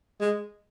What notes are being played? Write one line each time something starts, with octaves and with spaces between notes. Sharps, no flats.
G#3